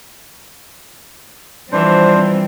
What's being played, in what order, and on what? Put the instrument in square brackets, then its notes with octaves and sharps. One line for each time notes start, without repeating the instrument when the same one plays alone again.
[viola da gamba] E3 F3 [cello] G3 C4 [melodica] D4 C5